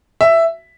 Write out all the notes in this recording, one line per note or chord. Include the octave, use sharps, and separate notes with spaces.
E5